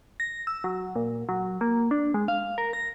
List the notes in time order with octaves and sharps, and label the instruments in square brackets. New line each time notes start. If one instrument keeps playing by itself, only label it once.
[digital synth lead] A#6
E6
F#3
A#2
F#3
A#3
D4
G#3
F5
A#4
A#6